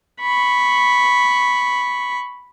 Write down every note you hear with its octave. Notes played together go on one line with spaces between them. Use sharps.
B5 C#6